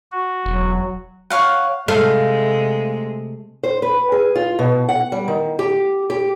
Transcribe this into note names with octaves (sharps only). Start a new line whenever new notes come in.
F#4
E1 F#3
C#5 F5 F#5
C3 G#3 A3 F5
C5
B4
G#4
F4
B2
F#5
G3
D#3
G4
G4